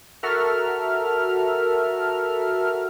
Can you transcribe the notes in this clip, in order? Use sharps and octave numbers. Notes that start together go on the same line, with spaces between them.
F#4 A4 A#4 E5 F6